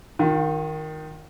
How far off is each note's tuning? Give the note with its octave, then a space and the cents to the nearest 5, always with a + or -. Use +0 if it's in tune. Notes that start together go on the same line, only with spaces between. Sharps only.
D#3 +0 F4 +40